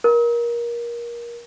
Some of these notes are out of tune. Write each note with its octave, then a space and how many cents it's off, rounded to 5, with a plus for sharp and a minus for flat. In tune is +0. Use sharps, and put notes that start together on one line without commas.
A#4 +20